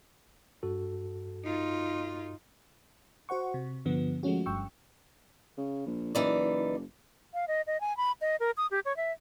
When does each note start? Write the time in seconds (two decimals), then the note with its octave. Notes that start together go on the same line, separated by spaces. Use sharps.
0.63 G2 F#4 A4
1.45 D#4 F4
3.29 F#4 C5 F#5 C#6
3.54 C3
3.86 G2 D3 F3 B3
4.23 F3 G#3 A3 C#4 F#4
4.46 G1 G2 G5 C#6 E6
5.57 C#3
5.86 A#1
6.15 F#1 E3 D#4 D5
7.34 F5
7.48 D#5
7.67 D#5
7.81 G#5
7.97 B5
8.21 D#5
8.40 A#4
8.57 D#6
8.71 G4
8.85 C#5
8.97 E5